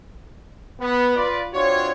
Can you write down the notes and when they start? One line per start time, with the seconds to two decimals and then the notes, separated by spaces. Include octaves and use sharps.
0.81 B3
1.16 F4 B4 D5
1.54 C4 D4 F4 F#4 C#5